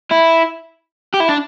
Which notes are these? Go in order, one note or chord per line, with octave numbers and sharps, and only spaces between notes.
E4
G4
E4
D4